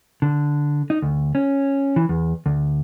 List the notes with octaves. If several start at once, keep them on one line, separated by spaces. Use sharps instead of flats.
D3
D#4
D2
C#4
E3
E2
D2